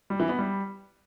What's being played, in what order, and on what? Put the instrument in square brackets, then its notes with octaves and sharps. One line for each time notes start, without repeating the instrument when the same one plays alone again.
[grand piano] G3
E3
B3
G3